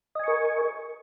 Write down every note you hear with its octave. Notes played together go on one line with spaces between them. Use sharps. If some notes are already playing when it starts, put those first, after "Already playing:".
A#4 D#5 G#5 C#6